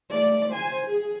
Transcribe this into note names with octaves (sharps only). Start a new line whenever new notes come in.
A3 D5
C5 G#5
G#4